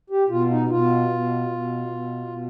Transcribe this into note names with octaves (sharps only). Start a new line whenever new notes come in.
G4
B2 F4
D#4
B2 F4
B2
B2
B2
B2